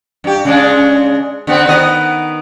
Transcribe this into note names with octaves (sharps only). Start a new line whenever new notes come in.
G2 G4
C#3 G#3 D4
D3 B3 C4
D#3 B3 D#5